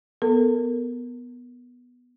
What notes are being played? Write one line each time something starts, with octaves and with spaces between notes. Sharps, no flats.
B3 A4 A#4